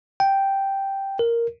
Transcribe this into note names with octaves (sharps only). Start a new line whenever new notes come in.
G5
A#4